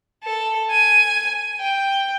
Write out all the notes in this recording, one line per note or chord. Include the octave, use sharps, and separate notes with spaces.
A4
G#5
G5